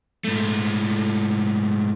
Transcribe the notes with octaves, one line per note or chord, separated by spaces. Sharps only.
G#2 A3